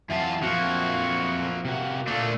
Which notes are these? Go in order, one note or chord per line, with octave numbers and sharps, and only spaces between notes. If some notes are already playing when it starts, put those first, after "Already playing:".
F2 E3 F#3 F4 E5 A5
F3 A#3 C4 F4 F#4
C3 A#3 F#4
A#2 A3 A#3 D4 A4